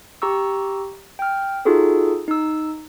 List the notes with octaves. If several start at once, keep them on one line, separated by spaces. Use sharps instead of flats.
G4 A#5 C#6 E6
G5 F6
D#4 F4 F#4 G#4 A4
D#4 E6